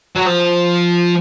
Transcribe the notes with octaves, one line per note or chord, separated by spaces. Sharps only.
F#3
F3